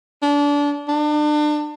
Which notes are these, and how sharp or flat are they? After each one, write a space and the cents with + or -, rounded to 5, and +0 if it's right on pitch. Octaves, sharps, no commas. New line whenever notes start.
D4 -25
D4 +35